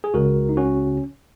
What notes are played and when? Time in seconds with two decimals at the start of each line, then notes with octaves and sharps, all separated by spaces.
0.04 G#4
0.14 C#2 C#3 F#4 A#4
0.49 D#4
0.57 C#4 F#4